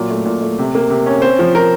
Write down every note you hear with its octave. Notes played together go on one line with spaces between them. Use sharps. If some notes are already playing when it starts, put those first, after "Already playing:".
Already playing: A#2 F#3
A3
A#2
A3
C3
A#3
C3
C#4
C4 C5
F3
F3 A#4